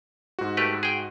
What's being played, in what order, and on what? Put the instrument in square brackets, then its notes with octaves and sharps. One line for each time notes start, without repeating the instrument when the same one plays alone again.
[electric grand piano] G#2 F#4
[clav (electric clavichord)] A3 G4 B4
G#4 G5